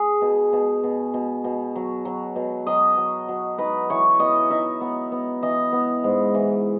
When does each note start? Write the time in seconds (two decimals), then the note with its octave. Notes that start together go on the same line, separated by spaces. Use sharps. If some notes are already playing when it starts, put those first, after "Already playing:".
Already playing: G#4
0.22 B2
0.53 B2
0.83 B2
1.14 B2
1.44 B2
1.75 F#3
2.05 F#3
2.36 B2
2.66 F#3 D#5
2.97 F#3
3.28 F#3
3.58 D#4 B4
3.90 E3 C#5
4.19 B3 D#5
4.50 D#4 E5
4.81 B3
5.12 B3
5.42 E3 D#5
5.72 B3
6.04 G#2
6.34 E3